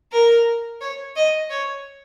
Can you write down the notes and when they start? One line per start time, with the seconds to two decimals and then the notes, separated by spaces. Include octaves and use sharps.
0.12 A#4
0.81 C#5
1.16 D#5
1.50 C#5